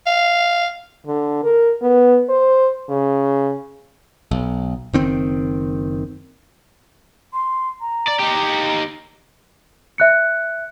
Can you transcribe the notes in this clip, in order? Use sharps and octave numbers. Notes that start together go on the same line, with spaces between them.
F5
D3
A#4
B3
C5
C#3
B1
F#1 D#3 C4
C6
A#5
D5
D#4 G4
E5 F#6 C#7